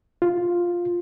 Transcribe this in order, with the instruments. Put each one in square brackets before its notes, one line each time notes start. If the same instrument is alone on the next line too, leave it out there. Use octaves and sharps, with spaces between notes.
[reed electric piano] F4